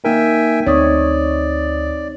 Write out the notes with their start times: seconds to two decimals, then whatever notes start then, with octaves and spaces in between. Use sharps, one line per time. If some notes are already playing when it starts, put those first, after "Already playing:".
0.05 A#3 D#4 A#4 E5 G5 G#5
0.66 D2 C4 D#4 C#5 D5 D#6